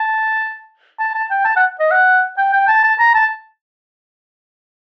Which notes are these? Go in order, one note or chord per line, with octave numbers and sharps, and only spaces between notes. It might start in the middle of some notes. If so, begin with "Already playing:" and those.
Already playing: A5
A5
A5
G5
A5
F#5
D#5
F#5
G5
G5
A5
A5
A#5
A5